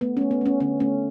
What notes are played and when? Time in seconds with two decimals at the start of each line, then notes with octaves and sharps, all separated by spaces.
0.01 A3 B3
0.17 A3 C#4
0.31 B3
0.41 A3 C#4
0.60 D3 C#4
0.80 A3 C#4